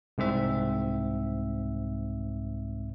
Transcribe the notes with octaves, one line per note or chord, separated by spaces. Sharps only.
C2 G#2 C4 E5